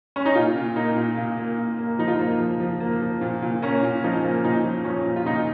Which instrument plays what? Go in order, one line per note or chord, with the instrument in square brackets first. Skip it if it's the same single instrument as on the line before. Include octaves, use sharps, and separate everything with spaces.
[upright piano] C#4
D#4
A#2 F4
A#2
A#3 D#4
A#2
A#2
A#3
A#2
A#3
F3 D#4
F4
A#3 D#4
F3
F3
A#3
F3
A#2
A#2
A#3 C#4
A#2
F3 D#4
A#3
A#2 D#4
F3
F3 C#4
A#2
F4
A#2 D#4